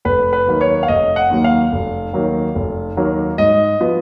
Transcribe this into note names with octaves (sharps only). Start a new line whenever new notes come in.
F1 B4
B4
D#2 D#3 F#3 A#3
C#5
F5
F1 D#5
F#5
D#2 D#3 F#3 A#3
F5
F1
D#2 D#3 F#3 A#3
F1
D#2 D#3 F#3 A#3
G#2 D#5
F3 B3